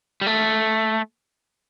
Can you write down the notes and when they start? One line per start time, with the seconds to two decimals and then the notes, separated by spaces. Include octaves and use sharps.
0.21 G3
0.27 A3